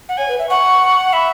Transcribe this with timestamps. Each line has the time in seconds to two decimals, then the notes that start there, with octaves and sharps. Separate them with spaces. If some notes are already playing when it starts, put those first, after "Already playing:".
0.09 F#5
0.17 C#5 G#5
0.28 B4
0.39 E5
0.50 F#5 C#6
1.13 E5 B5